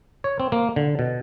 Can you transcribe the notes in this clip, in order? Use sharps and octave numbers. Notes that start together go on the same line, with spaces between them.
C#5
C4
A#3
D3
B2